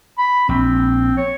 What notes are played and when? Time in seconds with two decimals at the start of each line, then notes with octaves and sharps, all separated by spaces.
0.18 B5
0.49 A#1 C4
1.17 C#5